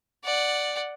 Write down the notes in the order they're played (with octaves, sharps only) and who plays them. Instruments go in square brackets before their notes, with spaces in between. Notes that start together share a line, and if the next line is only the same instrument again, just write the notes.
[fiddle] D5 F#5